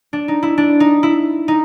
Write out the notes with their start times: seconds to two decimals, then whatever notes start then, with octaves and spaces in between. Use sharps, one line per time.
0.13 D4
0.28 D#4
0.43 E4
0.58 D4
0.80 D#4
1.03 E4
1.48 D#4